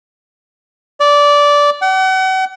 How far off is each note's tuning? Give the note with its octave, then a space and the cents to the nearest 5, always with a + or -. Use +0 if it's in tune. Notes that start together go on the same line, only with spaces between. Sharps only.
D5 -15
F#5 +40